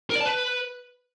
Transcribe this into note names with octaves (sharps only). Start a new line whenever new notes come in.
A#4
D5
A5
B4